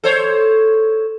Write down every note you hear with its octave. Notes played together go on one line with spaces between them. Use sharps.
A4 C5 C#5